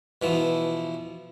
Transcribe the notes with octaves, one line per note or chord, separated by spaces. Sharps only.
B2 E3 F3